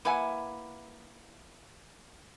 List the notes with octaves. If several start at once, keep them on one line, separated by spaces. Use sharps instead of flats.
A#3 E4 B4 E5 F#5 G#5